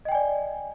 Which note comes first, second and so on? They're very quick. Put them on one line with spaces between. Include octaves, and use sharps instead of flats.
D#5 G5 G#5 D5